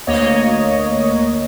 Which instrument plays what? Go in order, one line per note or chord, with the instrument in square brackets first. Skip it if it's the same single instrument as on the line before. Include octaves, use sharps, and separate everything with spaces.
[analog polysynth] D2 A#3 C#5 D#5